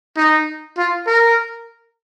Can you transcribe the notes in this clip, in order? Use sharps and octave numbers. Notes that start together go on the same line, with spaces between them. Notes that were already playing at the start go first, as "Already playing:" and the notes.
D#4
F4
A#4